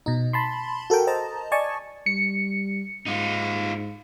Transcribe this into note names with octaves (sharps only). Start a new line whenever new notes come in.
B2 D#4
A5 B5 C6
F#4 A4 A#4 G5
C5 D#5 A5 A#5
D5 D#5 G#5 A5 C#6
G3 C#7
G#2 D#4 F4